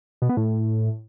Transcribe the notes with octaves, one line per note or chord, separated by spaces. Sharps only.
B2
B3
A2